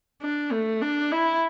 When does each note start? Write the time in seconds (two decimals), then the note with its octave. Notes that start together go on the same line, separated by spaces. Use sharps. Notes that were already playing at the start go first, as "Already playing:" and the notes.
0.21 D4
0.52 A3
0.82 D4
1.12 E4